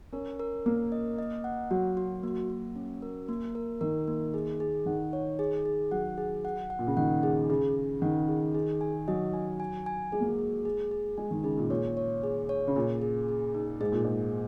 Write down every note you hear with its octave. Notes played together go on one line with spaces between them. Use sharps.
C#4 A#4
A#4
A#3 A#4
D#5
D#5
F#5
F#3 F#4
F#4
A#3
A#3
C#4
A#4
A#3
A#4
D#3 A#4
A#3
G#4
G#4
D#3 F#5
C#5
G#4
G#4
F#3 F#5
G#4
F#5
F#5
A#2
C#3
D#3 F#5
G#4
C#3 G#4
G#4
D#3 F#5
G#4
G#4
G#5
F#3 D#5
G#5
G#5
G#5
G#3 G#4
A#3
G#3
G#4
G#4
G#4
G#3 G#5
D#3
C#3 G#4
A#2
A#2 C#5
C#5
G#4
C#5
C#3
A#2 G#4
G#4
G#4
D#4
G#2 G#4
A#2
G#2 G#4